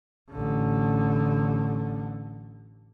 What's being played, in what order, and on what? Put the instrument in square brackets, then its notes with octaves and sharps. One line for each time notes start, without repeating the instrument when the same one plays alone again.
[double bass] A1 D3